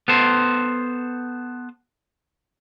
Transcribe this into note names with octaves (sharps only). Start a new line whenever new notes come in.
B3 A4 C5